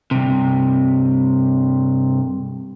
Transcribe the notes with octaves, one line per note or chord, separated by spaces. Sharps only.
G2 C3